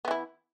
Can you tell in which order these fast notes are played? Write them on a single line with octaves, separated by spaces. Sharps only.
B3 E3 E4